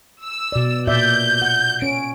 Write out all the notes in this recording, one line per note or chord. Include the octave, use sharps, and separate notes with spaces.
E6
B2 D5
A#2 D5 E5 G6
F#5
C#4 D7